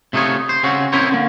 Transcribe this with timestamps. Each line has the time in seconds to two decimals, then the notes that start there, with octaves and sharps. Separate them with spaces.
0.13 C3 A3 D#4 F4 C#5
0.49 C5
0.63 C#3 C4 C#4 F#4
0.92 C4 C#4 E4 A#4 C5 C#5
1.11 D3 A#3